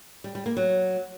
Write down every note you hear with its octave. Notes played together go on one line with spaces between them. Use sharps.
G3
G3
A#3
F#3